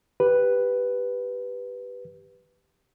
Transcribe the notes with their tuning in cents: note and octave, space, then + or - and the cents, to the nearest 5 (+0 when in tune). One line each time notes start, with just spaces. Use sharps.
G4 +0 B4 +0